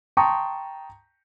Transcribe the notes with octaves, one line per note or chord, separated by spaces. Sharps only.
G5 A5 A#5 C6 C#6 D#6